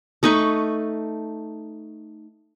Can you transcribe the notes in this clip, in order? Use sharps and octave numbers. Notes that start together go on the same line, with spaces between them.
A3 D#4 B4 C#6